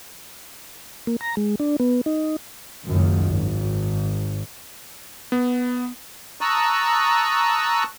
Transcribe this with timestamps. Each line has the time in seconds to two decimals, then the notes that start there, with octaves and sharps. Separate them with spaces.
1.07 A#3
1.21 A#5
1.37 G#3
1.60 D4
1.80 B3
2.06 D#4
2.85 F#1 C#2 F#2 D#3
3.24 G#1
5.32 B3
6.41 A5 A#5 C#6 D#6 E6 F#6